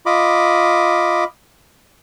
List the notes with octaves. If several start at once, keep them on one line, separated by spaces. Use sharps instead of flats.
F4 D#5 B5 D6